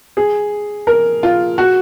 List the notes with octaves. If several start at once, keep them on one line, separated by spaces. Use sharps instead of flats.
G#4
A#4
F4
F#4